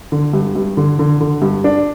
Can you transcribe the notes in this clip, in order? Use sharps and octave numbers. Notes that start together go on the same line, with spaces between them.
D3
G2
G2
D3
D3
D3
G2
D4